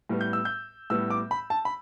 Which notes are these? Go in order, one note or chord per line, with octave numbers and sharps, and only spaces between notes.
A2 G3 B3
G6
E6
G6
A2 G3 B3 E6
D6
B5
A5
B5